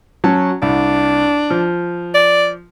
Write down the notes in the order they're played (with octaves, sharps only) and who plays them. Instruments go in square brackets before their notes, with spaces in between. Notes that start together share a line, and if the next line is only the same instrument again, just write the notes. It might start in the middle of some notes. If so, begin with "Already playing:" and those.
[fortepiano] F#3 C#4 A5
[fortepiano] C2 [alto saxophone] D4
[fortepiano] F3
[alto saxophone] D5